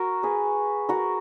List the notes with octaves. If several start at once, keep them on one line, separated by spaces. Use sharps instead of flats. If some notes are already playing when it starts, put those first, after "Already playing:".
Already playing: F#4 A#4
G#4 B4
F#4 A#4